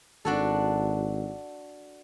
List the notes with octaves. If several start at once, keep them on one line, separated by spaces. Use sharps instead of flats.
G#1 D4 F#4 A4